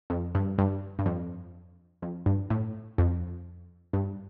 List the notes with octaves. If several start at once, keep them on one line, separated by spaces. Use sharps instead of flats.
F2
G2
G2
G2
F2
F2
G2
A2
F2
G2